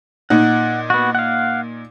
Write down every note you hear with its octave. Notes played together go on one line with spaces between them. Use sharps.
A#2 D#4 F#5
B3 F#4
F5 F#5